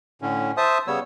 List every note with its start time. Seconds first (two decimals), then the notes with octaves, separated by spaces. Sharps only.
0.22 A2 D3 C#4
0.57 C5 E5 A5 D#6
0.87 C#3 G3 B3 C#5 E6